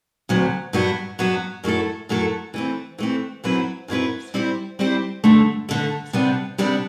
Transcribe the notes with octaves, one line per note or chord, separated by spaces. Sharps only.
D2 C3 F#3 B3
G2 F#3 B3 F#4
G2 F#3 B3 F#4
F#2 F#3 A3 E4 A4
F#2 F#3 A3 E4 A4
E3 A3 C4
E3 A3 C4
F#2 F#3 C4 E4 B4
F#2 F#3 C4 E4 B4
G3 C4 E4 G4 C5
G3 C4 E4 G4 C5
G2 D3 A3
G2 D3 A3
C3 G3 B3 D4
C3 G3 B3 D4